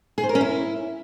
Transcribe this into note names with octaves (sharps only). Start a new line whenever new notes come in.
G#4
C5
A#4
C#4
E4